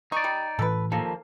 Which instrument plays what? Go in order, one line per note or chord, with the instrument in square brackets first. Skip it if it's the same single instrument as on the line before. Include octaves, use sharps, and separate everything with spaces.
[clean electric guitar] D#4 D5 [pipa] C#6
[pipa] G3
[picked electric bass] A2 E3 [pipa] A4 B4
[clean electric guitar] D#2 F3 A#3 [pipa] A4